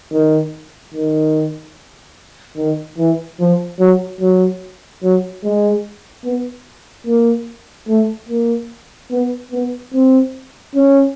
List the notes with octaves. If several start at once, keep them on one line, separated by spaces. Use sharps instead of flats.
D#3
D#3
D#3
E3
F3
F#3
F#3
F#3
G#3
B3
A#3
A3
A#3
B3
B3
C4
C#4